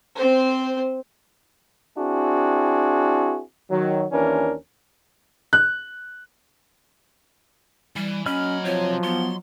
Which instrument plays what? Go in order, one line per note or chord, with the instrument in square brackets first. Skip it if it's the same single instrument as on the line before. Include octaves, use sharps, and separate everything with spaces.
[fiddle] C4 C5
[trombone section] C4 D4 E4 F#4 G#4
D#3 F#3
D#2 E3 C#4 D4 A#4
[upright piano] F#6
[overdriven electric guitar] E3 [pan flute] G3
[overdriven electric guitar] A#2 B5 [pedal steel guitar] F#3 D#5 F6 [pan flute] C#4
[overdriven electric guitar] C3 C4 [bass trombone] F3 [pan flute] C#5
[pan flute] B3 [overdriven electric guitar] C6